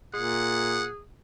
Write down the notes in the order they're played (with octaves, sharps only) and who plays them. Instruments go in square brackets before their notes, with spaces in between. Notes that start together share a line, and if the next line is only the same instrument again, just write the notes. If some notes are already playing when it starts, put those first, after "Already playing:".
[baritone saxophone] A#2 [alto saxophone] G#4 [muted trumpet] F#5